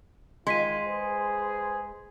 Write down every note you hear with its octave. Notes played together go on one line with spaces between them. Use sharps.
D#3 G#3 F4 C6 B6 D#7
G#4 B4 C5